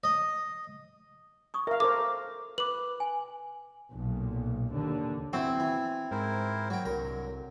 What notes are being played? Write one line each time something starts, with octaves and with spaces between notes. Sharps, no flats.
D#5
C#6 D#6
A#4 E5 F5
A4 A#4 C5 D6
B4 D6 F#7
G#5
B1 A#2
D#2 D3
E3 C4 F#4
E3
G#2 E4 A#4 C5
F#3 G5
C2 D3 F#3 A#4